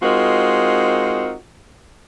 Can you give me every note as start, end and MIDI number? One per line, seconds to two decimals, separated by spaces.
0.02 1.34 56
0.02 1.34 60
0.02 1.34 63
0.02 1.34 65
0.02 1.34 66
0.02 1.34 70